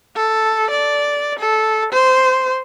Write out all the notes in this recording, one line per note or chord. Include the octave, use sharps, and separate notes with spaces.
A4
D5
A4
C5